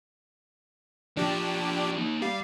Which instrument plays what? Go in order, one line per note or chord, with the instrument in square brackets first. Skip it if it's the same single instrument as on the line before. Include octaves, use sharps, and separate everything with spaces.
[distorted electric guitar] F3 D5 [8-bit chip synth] D4 G4
[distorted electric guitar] A#3 D#4
[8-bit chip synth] G3 [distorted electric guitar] F5